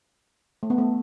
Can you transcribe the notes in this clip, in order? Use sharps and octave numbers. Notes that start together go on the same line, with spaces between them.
A3
B3
A3